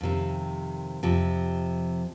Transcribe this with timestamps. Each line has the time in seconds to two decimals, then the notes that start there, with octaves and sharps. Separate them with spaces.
0.01 F2 C3 D#3
1.03 F2 C3 F3